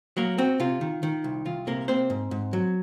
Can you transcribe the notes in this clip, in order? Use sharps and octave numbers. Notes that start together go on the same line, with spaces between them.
F#3 A#3 A#4
C4 F#4
C3 F4
D#3
D#3
C2
C2 F4
C3 A#3 A#4
A#3 C4 C5
G#2
G#2
F#3